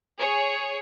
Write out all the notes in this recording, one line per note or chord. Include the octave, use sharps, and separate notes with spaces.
G#4 C#5